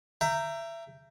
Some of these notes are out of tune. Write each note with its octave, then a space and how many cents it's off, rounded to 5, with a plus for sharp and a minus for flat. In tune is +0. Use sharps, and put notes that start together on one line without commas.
E5 +25 G5 -5 A#5 -10